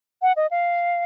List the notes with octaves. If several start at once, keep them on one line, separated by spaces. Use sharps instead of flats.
F#5
D#5
F5